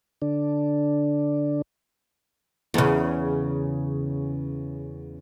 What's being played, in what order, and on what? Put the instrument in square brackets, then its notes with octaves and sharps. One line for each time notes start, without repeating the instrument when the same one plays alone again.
[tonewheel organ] D3 D4
[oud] E2 C#3